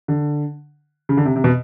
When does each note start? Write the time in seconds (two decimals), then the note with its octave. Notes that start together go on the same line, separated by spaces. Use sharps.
0.08 D3
1.09 C#3
1.17 D3
1.26 C3
1.36 C3
1.44 B2